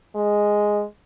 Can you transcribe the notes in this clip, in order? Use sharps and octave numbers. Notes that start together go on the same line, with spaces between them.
G#3